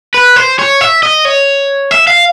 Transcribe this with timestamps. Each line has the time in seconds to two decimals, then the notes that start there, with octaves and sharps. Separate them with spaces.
0.14 B4
0.36 C5
0.59 C#5
0.81 E5
1.03 D#5
1.25 C#5
1.91 E5
2.07 F5